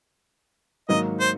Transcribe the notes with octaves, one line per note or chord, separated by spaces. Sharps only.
G#2 D#3 F#3 A#3 D#4 D#5
C5